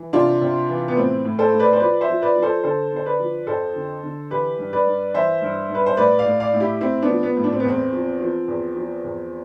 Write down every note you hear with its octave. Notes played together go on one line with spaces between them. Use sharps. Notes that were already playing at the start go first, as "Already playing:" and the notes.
Already playing: E3
C3 D4 F4
C3
E3
B3
A2 C4
A2
A4 C5
A2
B4 D5
C5
F3 B4 D5
C5 E5
F3
B4 D5
F3
A4 C5
D3 A4 C5
D3 C5
B4 D5
F3
F2 A4 C5
D3
D3
E3 G4 B4
G2
B4 D5
G2
E3 C5 E5
G2
G2 B4
C5
A2 B4 D5
D5 F5
A2
D5 F5
A2
E4 G4
A2 C4 E4
B3 D4
F3
B3
A2
D4
C4
B3
E2 C4
F3
F3
E2
F3
E2